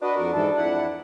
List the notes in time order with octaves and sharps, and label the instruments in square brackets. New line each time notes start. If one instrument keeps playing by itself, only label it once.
[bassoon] D4 [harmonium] F#4 B4 D#5
[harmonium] F2 F#4 A#4
G#2 E3 A4
F2 E4 F#5